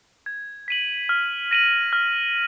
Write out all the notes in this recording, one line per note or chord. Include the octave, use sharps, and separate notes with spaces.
G#6
B6 D#7 F#7
F6
A#6 D#7 F#7
F6